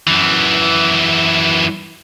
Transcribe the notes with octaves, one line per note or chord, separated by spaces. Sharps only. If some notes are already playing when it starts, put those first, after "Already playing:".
F#2 E3